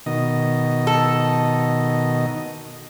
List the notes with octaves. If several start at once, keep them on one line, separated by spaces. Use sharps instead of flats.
B2 D#3 D#5
A4